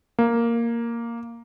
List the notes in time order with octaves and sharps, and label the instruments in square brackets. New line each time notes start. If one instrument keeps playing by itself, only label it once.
[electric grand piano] A#3